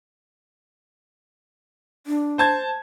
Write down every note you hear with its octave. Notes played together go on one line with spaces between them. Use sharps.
D4
C5 A5 G#6